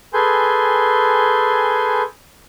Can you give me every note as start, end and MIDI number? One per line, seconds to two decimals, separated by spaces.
0.14 2.02 68
0.14 2.02 69
0.14 2.02 71
0.14 2.02 80
0.14 2.02 84
0.14 2.02 91